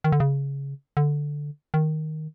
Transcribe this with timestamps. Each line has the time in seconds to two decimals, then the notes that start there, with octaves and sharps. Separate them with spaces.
0.04 D#3
0.12 D3
0.20 C#3
0.97 D3
1.74 D#3